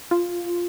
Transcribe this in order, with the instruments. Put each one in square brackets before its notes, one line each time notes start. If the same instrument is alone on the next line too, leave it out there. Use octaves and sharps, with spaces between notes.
[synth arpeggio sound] F4